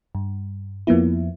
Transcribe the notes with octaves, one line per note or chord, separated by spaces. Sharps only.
G2
F2 F3 A#3 B3 E4